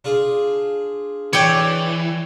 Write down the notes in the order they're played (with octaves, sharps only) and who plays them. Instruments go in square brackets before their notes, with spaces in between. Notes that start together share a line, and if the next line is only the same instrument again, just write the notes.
[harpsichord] D4 F4 G#4
[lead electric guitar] E3 [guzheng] C#5 D5 G5